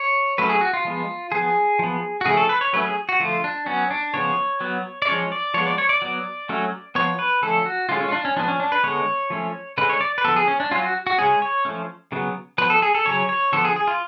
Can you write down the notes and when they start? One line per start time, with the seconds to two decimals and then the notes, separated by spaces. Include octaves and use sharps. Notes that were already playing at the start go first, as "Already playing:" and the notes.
Already playing: C#5
0.38 F#3 A3 C#4 B4
0.49 G#4
0.61 F#4
0.73 F4
0.85 F3 G#3 B3
1.32 F3 B3 G#4
1.79 F3 B3
2.21 F#4
2.26 C#3 F3 A3 C#4 G#4
2.37 A4
2.49 B4
2.61 C#5
2.73 F#3 A3 C#4 B4
2.84 G#4
3.09 F#4
3.19 D3 F3 A3 F4
3.44 D4
3.66 F#3 B3 C#4
3.90 D4
4.14 C#3 F3 B3 C#5
4.61 F#3 B3
5.02 D5
5.07 F3 G#3 C#4 C#5
5.32 D5
5.54 F3 G#3 B3 C#5
5.67 D5
5.78 C#5
5.89 D5
6.02 F#3 B3
6.49 F#3 A3 C#4
6.95 F3 B3 C#5
7.19 B4
7.42 D3 F3 A3 C#4 A4
7.66 F#4
7.89 D3 G#3 C#4 F4
8.01 C#4
8.09 F4
8.12 D4
8.25 C#4
8.37 F3 B3 D4
8.48 C#4
8.60 D4
8.72 B4
8.84 D3 G#3 B3 C#5
9.30 F3 A3 C#4
9.78 D3 G#3 C#4 B4
9.89 C#5
10.01 D5
10.18 B4
10.25 D3 F3 B3 A4
10.36 G#4
10.48 C#4
10.60 D4
10.71 F#3 C#4 F4
10.82 F#4
11.07 F#4
11.18 C#3 G#3 C#4 G#4
11.42 C#5
11.65 F3 A3 C#4
12.12 C#3 F#3 B3
12.58 F3 B3 B4
12.70 A4
12.82 G#4
12.95 A4
13.05 C#3 F#3 C#4 C#5
13.29 C#5
13.52 D3 F3 B3 A4
13.65 G#4
13.76 G#4
13.87 F4